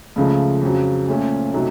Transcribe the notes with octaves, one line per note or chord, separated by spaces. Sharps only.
C#2 C#3 F3 A3
F2 C#3 F#3
A#2 A3 C#4
C3 F#3 A3 D#4